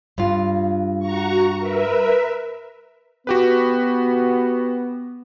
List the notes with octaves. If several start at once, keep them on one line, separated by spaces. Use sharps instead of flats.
G2 F4
F#4 A#5 C#6
A#4 B4 E5
B3 F#4 G4 B4